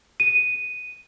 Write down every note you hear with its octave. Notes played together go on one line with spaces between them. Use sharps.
D#7